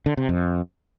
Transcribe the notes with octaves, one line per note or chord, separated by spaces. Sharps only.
D3
C3
F2